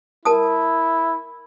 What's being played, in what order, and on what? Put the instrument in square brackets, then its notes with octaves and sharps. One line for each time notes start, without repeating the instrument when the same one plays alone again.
[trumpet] E4 [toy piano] A#4 A5 D#6